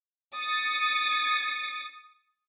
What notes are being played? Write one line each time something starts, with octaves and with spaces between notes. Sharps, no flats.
D#6 A6 C#7